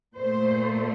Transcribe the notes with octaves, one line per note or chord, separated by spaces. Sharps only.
A#2 A3 C5